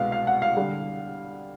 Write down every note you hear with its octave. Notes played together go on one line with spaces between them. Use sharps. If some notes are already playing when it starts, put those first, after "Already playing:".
Already playing: C2 B2 G#3 B3 F5
F5
F#5
F5
D3 G3